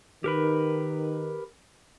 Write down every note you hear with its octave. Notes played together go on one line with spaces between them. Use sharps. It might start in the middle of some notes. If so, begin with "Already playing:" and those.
D#3 G4 A#4 B4